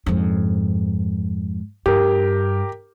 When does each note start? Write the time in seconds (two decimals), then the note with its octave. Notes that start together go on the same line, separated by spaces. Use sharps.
0.06 F2 G#2
1.86 G2 G4 A#4